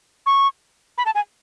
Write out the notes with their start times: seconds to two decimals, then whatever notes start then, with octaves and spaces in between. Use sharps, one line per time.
0.26 C#6
0.98 B5
1.06 A5
1.15 G#5